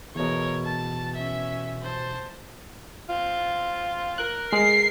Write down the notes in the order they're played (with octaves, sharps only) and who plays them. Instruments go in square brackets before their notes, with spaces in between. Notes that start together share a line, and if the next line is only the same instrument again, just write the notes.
[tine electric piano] E2 B2 [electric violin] A#4 C#5
[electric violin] A5
C#4 E5
C5 A5
[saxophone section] C4 F4
[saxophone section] A#4 [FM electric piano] F#6
[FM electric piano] G#3 [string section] C7